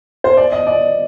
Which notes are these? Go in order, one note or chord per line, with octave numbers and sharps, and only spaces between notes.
C5
D5
D#5
D5